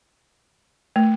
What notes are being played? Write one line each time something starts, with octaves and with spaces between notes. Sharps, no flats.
A3